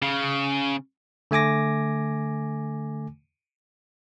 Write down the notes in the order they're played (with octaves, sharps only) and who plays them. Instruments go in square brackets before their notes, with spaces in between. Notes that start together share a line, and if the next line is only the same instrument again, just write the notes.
[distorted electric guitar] C#3
[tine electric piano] D3 A3 G#5 D6 A#6